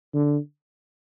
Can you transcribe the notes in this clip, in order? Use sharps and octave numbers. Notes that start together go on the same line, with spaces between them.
D3